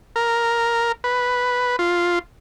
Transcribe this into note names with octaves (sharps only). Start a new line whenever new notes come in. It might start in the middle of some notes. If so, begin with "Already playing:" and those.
A#4
B4
F4